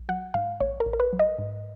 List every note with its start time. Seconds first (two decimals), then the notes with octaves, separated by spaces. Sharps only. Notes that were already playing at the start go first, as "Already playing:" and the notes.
Already playing: A#1
0.09 F#3 F#5
0.34 G#2 F5
0.60 A#1 C#5
0.80 A#4
0.86 A#1
0.93 A#4
1.00 B4
1.13 F#3
1.19 D#5
1.39 G#2